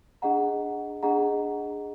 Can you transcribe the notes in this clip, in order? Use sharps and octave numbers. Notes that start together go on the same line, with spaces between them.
D4 G#4 D#5 F#5 A#5
D4 G#4 D#5 F#5 A#5